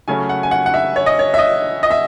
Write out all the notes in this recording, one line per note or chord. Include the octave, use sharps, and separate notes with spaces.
C#3 F#3 A3 C#4 G#5
F#5
G#5
F#5
F#5
E5
C#5
D#5
C#5
E5
D#5
D#5
E5